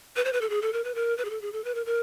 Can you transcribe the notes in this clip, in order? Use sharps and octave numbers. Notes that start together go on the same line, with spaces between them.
B4
C5
B4
A4
G#4
A4
A#4
B4
A#4
B4
G#4
A4
G#4
A4
B4
A#4
A#4